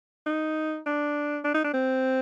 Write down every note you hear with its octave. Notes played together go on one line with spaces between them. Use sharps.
D#4
D4
D4
D#4
D4
C4